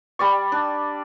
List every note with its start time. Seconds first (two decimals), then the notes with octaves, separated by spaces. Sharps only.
0.19 G3 D5 C#6
0.52 D4